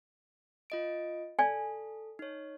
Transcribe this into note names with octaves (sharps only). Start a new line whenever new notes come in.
F4 D#5 D7
A4 D5 G#5
D#4 C#5